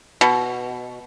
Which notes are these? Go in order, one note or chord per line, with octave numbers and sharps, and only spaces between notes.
B2